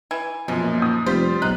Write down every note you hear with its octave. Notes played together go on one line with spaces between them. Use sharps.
E3 G#6
F#2 B2 F3 G#3
A#2
D#6 G6
F1 G3 F4 C5 B6
B1 D#4 F#6